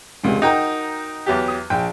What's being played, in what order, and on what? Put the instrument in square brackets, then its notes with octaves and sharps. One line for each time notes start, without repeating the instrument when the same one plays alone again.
[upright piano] E1 C#2 C3
[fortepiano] D#4 G5 [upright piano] F#4 A#4 A#5
[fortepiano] E2 F#3 G4
[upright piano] D#6
[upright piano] A#1 [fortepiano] G5